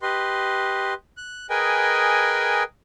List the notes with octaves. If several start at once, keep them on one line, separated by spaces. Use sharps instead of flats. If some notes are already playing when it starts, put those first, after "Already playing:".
G4 B4 D#5 C6
F#6
G#4 A#4 B4 D#5 G5 G#5